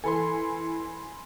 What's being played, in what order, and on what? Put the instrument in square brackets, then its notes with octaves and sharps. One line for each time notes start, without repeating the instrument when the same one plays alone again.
[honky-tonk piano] E3 A4 [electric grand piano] G#5 B5 C6